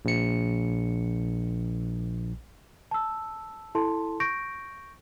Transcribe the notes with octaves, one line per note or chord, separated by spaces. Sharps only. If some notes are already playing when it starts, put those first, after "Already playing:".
A#1 C#7
A5 E6
E4 A4 A5 C6
C#6 G6 A#6 D7